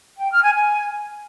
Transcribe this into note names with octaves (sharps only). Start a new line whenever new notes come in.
G5
F6
G#5
G#5